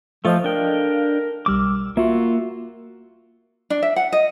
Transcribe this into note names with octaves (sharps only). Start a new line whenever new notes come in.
F3 A3 F4 A4 D#5 F5
D4 A#4 G5
B1 G3 D6 E6 F6
A#3 F4 F#4 E5
D4
E5
F#5
D#5